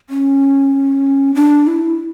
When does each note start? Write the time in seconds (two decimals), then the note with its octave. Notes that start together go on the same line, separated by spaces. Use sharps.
0.10 C#4
1.35 D4
1.67 E4